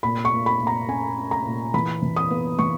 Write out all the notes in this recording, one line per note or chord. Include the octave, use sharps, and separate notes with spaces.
A#2 B5
C#6
A#2
B5
A#2
A#5
C#4 G#5
C#4
A#5
A#2
E3 B5
E3
D#6
B3
E3 C#6